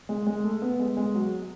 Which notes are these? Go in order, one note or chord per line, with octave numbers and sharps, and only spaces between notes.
G#3
G#3
A3
B3
G#3
G#3
F#3